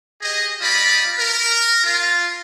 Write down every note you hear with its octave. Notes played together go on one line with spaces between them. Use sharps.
G4 G#4 D#5
G3 F4 D5 D#5 B5
A#4
F4